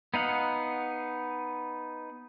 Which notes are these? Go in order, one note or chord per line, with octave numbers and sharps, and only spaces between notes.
B3 D#4 F5 F#5